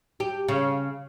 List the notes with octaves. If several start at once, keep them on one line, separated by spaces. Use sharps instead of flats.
G4
C#3